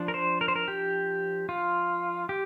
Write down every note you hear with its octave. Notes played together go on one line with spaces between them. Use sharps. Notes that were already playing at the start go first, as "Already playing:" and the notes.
Already playing: F3 D4
A#4
C5
A#4
C5
A#4
G4
F4
G4